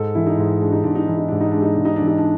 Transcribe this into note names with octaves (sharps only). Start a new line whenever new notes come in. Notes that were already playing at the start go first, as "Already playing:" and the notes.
Already playing: G#2 A4
E3 E4
D#4
G#2
G#3 D4
D#4
G#2 D4
D#4
E3 D4
D#4
G#2 D4
D#4
G#3 D4
D#4
G#2 D4
D#4
E3 D4
D#4
D4